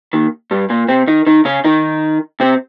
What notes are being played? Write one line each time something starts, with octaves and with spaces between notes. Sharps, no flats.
D#2 D#3
G2 G3
A#2 A#3
C3 C4
D#3 D#4
D#3 D#4
C#3 C#4
D#3 D#4
C3 C4